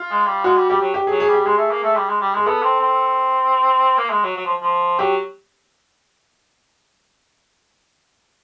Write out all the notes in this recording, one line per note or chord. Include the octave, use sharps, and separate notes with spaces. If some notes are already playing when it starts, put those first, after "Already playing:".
Already playing: F4
G#3
G3
G#3 F#4
G3
G3 G4
F#3
G4
G#4
F#3
G#4
G3
G4
G#3 G#4
A3
A#3
A3
G3
G#3
G3
G#3 G#4
B3 A4
C4
C4
A#3
G#3
F#3
F#3
F3
F3
F#3 G4